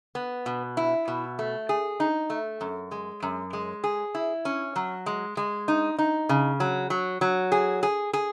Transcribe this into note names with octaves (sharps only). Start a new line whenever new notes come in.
B3
B2
E4
B2
A3
G#4
D#4
A3
F#2
G#3
F#2
G#3
G#4
E4
C#4
F#3
G#3
G#3
D#4
D#4
C#3
F#3
F#3
F#3
G#4
G#4
G#4